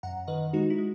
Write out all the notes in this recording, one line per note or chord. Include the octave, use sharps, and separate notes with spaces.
F#2 F#5 A#5
D#3 B4 D#5
G#3 D#4 F#4
E4
G#3